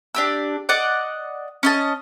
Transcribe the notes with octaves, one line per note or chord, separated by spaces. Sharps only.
D4 G4 E6
D5 D#5 F#5 D6
C#4 D#5 A5